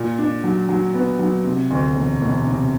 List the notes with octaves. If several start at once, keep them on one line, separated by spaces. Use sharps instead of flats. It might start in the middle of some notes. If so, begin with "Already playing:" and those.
Already playing: A#2
D4
F#3
F#3
B3
F#3
C3
D2
E1
E1
C3